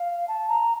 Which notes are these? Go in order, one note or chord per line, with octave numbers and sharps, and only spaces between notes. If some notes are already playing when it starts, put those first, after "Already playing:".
Already playing: F5
A5
A#5